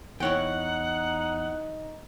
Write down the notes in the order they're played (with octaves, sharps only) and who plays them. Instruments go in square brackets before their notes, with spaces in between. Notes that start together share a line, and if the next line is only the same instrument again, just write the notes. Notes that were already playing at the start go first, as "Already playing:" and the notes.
[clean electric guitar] E2 [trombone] D#4 [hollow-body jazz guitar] E4 C#5 G5 [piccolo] F#5